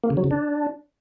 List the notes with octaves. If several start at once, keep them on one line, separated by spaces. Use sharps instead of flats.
A#3
C#3
F#3
C#3
D4